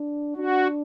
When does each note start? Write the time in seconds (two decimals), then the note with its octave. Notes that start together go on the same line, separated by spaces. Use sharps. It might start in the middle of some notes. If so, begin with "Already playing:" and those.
Already playing: D4
0.36 D4 F#4